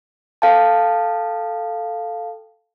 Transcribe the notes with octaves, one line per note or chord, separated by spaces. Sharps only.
A4 F5 G5 A5